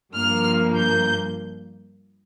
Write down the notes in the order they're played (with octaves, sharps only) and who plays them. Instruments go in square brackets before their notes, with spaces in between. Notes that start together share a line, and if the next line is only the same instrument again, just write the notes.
[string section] G2 F3 A#3 F6
G6